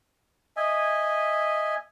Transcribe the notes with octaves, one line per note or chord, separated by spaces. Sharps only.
D#5 E5 G#5